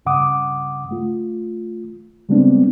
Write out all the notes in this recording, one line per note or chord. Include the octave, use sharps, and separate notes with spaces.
C2 G2 C#3 F#5 D6 D#6
A3 F4
C#3 G3 G#3 B3 C4 D4